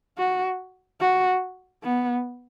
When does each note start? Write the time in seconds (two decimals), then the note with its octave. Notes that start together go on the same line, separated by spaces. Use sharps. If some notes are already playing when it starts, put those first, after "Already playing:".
0.18 F#4
1.01 F#4
1.84 B3